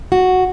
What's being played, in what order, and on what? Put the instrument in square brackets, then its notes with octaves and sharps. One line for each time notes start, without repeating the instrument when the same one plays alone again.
[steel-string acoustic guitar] F#4